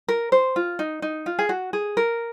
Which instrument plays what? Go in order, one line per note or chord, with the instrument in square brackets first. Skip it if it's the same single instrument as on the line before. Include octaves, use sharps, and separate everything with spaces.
[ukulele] A#4
C5
F4
D#4
D#4
F4
G#4
F#4
G#4
A#4